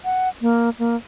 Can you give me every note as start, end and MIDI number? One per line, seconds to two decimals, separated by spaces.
0.05 0.29 78
0.41 0.70 58
0.79 0.96 58